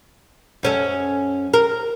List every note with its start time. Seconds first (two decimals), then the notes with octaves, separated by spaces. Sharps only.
0.63 F#2 C#4 A4
1.54 A#4